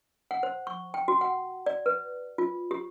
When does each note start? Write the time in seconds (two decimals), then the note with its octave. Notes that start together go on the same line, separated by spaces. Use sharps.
0.31 F#5
0.43 C5
0.67 C#6
0.94 G5
1.08 F#4
1.21 F#5
1.66 D5
1.86 B4
2.38 F4
2.71 G4